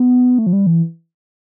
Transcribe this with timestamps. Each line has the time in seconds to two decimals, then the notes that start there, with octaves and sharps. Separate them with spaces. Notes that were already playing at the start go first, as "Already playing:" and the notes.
Already playing: B3
0.38 A3
0.47 F3
0.53 G3
0.67 E3